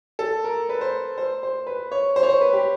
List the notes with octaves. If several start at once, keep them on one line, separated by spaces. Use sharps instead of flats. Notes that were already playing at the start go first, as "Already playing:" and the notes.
A4
A#4
B4
C5
C5
C5
B4
C#5
C5
C#5
C5
B4
G4